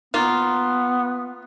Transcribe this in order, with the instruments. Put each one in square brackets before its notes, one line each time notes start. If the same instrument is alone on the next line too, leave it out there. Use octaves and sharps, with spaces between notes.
[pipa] A#3 F4 [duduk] B3